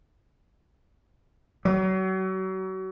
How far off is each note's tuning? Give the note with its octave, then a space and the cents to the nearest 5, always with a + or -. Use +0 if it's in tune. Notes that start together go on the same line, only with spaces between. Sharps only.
F#3 +35